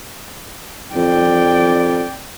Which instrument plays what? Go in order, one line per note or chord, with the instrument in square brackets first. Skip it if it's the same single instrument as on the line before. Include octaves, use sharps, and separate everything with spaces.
[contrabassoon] F2 [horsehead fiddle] D5 G5